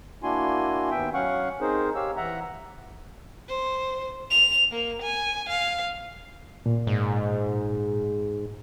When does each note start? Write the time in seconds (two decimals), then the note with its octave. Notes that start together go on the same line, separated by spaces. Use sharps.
0.23 A#3 D4 E4 F#4 G#5 C6
0.91 D#2 B3 E5 G5
1.14 F#3 C#4 F5 F#5 C#6
1.61 C4 D#4 G#4 A#4 C5
1.95 G4 C#5 F5 E6
2.17 E3 E5 F#5 A#5
3.48 C5
4.31 F7
4.71 A#3
5.02 G#5
5.50 F5
6.66 A#2
6.87 G#2